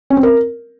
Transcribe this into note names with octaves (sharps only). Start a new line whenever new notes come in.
C#4
C4
A#4